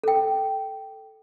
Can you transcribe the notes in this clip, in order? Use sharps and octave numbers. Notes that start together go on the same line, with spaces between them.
A4 G5